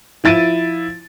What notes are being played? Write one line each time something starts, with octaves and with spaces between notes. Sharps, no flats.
F3 E4 A6 D7 D#7